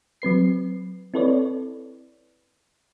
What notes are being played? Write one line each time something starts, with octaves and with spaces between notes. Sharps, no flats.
F#3 C4 B4 C7
C4 E4 A4 B4 C#5 D5